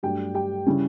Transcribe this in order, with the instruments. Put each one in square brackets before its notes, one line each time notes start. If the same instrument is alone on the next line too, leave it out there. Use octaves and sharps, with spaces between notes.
[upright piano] G2 F#3 A3 D4 G4 G5
G4 G5
C#3 G3 C#4 E4